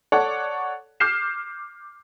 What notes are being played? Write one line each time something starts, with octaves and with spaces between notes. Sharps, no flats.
A4 C#5 D5 F#5
D6 F6 G6 C7 E7